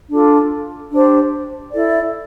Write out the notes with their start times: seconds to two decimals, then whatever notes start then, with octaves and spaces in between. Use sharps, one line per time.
0.08 D4 F4 A4
0.90 D4 G4 C5
1.70 E4 A4 D5